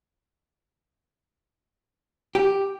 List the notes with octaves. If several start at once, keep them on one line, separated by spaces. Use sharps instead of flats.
G4